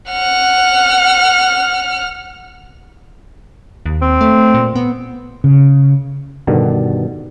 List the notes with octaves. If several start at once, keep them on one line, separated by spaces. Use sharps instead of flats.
F#5 F6
D#2
C4
A3
A#2
B3
C#3
G2 B2 D3 D#3